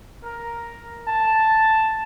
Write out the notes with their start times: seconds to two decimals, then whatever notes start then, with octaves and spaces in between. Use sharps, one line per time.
0.25 A#4
1.07 A5